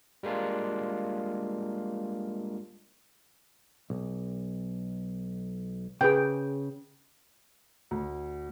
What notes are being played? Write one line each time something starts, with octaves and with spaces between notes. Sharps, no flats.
G3 G#3 A#3 D4 F4
B1
C#3 G#4 B4 G5
D2